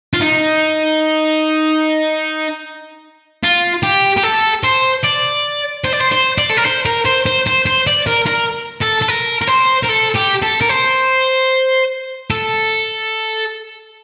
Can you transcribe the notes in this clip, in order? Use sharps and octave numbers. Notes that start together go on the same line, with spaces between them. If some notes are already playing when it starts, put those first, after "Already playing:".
F4
D#4
F4
G4
G4
A4
C5
D5
C5
D5
C5
C5
D5
A4
A#4
C5
A#4
C5
C5
C5
C5
D5
A#4
A#4
A4
A4
A#4
A#4
C5
A#4
A4
G4
A4
A#4
C5
A4